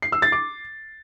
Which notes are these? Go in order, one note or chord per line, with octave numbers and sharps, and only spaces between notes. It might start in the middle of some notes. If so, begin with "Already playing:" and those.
C7
E6
A6
D6